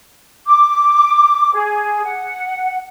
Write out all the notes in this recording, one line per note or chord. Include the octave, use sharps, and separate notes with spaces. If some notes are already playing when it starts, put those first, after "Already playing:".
D6
G#4
F#5